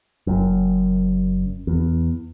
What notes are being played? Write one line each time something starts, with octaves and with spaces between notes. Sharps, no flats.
F#1 F#2
E2